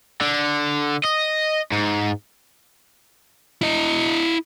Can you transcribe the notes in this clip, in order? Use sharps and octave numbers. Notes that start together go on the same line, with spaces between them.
D3
D#5
G#2
E4 D#5